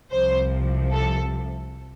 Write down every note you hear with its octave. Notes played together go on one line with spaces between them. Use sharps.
C2 C3 F3 C5
A4